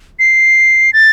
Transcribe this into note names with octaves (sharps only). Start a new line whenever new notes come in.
C7
A6